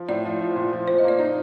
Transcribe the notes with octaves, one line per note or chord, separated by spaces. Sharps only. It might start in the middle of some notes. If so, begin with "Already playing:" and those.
Already playing: F3
A2 D5
F3
F3
A#2
F3
A#2 C5
D#5
A#3 D5
D#4 D5